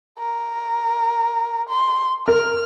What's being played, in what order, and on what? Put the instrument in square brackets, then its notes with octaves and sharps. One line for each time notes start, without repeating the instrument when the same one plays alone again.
[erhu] A#4
C6
[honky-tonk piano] A#4 [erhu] F6